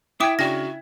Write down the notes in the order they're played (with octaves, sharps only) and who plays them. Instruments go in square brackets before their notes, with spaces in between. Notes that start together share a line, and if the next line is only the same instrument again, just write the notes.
[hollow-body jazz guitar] E4 [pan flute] G5 [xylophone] D6 D#6 [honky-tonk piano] G#6 B6
[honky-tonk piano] C#3 D4 [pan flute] F#4 [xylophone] G5 A#6